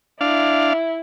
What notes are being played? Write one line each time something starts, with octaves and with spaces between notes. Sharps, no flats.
D4 E4 F5